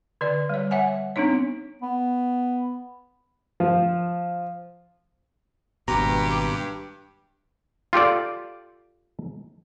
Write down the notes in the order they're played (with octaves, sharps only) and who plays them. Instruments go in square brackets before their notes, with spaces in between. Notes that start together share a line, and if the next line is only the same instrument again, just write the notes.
[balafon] D3 B4 D5
G3 C#5
C#5 E5 F#5 G#5
B3 C4 D4 D#4 C#5
[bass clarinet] B3
[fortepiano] F3
[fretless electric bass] G#1 B2 [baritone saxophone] G2 [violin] G4 [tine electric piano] A#5
[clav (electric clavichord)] F4 G4 A4 D5